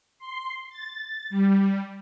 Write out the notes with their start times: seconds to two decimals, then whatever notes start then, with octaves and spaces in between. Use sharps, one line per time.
0.19 C6
0.70 A6
1.30 G3